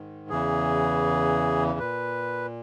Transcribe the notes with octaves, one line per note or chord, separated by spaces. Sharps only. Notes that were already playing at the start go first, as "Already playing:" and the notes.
Already playing: G#2 D#3
E2 C#3 E3 G#4
A#2 B4